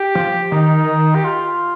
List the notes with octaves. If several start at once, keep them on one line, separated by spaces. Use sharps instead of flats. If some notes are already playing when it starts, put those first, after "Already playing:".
Already playing: G4
F3
D#3 D#4
G4
F4